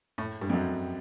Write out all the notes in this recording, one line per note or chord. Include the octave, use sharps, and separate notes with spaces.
A2
G2
F2
F#2